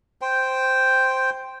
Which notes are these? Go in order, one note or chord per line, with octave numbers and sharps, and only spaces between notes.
C5 G5